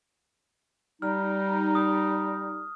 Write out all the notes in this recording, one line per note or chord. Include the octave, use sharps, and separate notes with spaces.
G3 D#4 F6
D#6